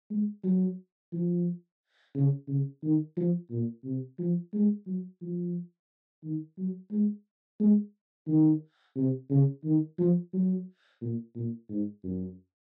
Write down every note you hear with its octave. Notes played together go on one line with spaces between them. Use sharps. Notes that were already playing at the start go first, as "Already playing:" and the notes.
G#3
F#3
F3
C#3
C#3
D#3
F3
A#2
C3
F3
G#3
F#3
F3
D#3
F#3
G#3
G#3
D#3
C3
C#3
D#3
F3
F#3
A#2
A#2
G#2
F#2